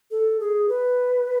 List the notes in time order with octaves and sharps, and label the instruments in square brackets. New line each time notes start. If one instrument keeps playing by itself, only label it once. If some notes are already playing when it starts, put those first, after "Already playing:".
[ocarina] A4
G#4
B4